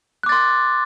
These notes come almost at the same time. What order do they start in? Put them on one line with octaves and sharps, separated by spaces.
F#6 D6 A6 C6